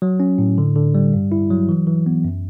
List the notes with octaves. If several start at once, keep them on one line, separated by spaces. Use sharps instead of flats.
F#3
C#4
A2
D3
D3
G3
G2
E4
F#3
E3
E3
B3
F#2